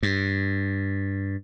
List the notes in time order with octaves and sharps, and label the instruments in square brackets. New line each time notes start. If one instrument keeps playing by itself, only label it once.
[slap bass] G2